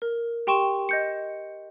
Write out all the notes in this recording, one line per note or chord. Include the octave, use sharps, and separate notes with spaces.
A#4
G4 G5 C6 C#6 E7
D#5 G6 C#7